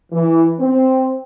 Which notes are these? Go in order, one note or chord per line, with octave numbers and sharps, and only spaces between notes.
E3
C4